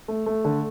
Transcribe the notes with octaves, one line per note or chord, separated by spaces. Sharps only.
A3
A3
D3